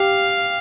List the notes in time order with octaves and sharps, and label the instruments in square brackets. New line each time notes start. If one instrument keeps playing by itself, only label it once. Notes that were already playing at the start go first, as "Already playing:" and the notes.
Already playing: [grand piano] G4 [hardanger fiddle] F5